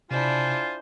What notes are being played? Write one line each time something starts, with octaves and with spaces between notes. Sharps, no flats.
C3 D4 E4 F4 C5 G#5